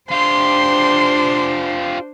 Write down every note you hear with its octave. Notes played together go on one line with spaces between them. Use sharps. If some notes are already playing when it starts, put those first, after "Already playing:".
D4 F4 G4 C5 C6